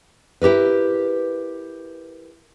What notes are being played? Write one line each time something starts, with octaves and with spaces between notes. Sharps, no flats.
E4 G4 A#4 B4